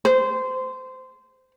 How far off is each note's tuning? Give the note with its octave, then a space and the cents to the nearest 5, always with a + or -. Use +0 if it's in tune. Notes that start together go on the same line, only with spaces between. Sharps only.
C5 -20